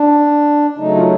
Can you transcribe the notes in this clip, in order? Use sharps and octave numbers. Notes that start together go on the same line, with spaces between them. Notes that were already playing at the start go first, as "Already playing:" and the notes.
Already playing: D4
C#3 F#3 A3 D#4
F4